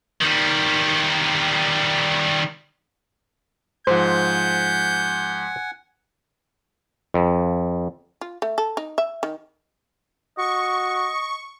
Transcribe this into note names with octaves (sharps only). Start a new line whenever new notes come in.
D#3 G3
G#2 F3 C5 F#5 G#5 G6
F2
F4
A3
A4
D#4
E5
D#3
F#4 D#5 C#6